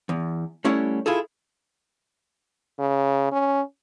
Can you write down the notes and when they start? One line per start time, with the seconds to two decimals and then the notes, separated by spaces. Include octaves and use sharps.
0.09 E2
0.65 G3 A3 C#4 E4 C#5 F#5
1.06 E4 F4 G#4 A4
2.79 C#3
3.32 C#4